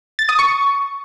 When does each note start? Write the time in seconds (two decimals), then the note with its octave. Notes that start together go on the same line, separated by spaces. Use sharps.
0.19 A6
0.29 D#6
0.39 C#6